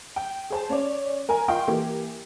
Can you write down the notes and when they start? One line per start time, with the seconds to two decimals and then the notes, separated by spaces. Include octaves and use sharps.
0.16 G5
0.50 G#4 C5 A5
0.69 C#4 C#5 D5
1.29 A#4 G#5 A#5
1.48 F4 D#5 F5 G5 C6 C#6
1.68 E3 A#3 G4